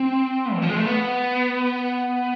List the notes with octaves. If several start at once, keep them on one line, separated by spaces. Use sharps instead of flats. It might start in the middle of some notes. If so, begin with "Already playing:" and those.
Already playing: C4
E3
F3
G#3
A3
B3